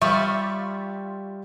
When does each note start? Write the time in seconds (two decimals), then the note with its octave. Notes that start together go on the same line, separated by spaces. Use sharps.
0.01 G3 F4 E5 C#6 D6